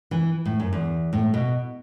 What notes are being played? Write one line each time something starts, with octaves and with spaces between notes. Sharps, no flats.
E3
A2
F#2
E2
A2
B2